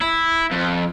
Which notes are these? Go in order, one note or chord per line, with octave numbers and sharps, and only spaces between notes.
E4
F2